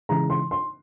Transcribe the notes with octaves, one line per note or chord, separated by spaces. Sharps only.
C#3 E3 G#3 A#5
C6
C6